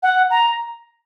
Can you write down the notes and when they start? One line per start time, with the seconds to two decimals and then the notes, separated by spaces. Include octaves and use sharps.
0.03 F#5
0.30 A#5